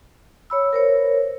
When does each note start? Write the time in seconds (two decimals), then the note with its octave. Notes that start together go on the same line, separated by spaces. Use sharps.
0.50 C#5 B5 E6
0.73 A#4 C5 C#5